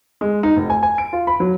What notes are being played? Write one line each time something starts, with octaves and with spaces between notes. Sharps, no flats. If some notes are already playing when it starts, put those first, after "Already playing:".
G#3
D#4
F1
G#5
G#5
D7
F4
B5
F#3